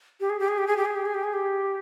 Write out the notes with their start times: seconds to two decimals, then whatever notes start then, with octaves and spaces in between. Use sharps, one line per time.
0.20 G4
0.30 G#4
0.39 G4
0.48 G#4
0.58 G4
0.67 G#4
0.77 G4
0.86 G#4
0.95 G4
1.06 G#4
1.14 G4
1.24 G#4
1.34 G4